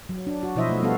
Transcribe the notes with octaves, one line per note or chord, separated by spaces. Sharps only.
F#3
D4
F#4
B2 F3 E4 C5 D#5 E5
A3
G3 B3 F#4 A4 F5